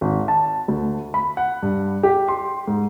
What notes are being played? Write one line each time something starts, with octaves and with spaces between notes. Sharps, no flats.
G#1
A5
D2
B5
F#5
G2
G4
C6
G#2